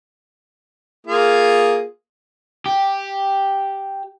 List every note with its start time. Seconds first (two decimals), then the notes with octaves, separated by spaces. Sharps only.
1.07 A#3 F4 G#4
2.66 G4